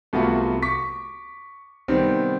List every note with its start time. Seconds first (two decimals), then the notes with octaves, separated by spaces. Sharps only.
0.13 C2 A3 B3 F4 F#4 E5
0.62 C#6 D6 B6
1.88 C3 D#3 G3 B3 C4